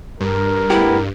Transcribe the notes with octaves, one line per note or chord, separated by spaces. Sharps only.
G2 A#4
A3 B3 E4 G4